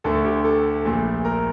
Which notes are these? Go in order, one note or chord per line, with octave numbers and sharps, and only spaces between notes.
D2 D3 A3 A4
G4
A4
A#1 A#2 A3
A#4